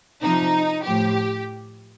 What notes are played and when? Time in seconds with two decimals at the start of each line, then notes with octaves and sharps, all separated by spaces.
0.22 C3 F3 D#4
0.85 A2 F3 G4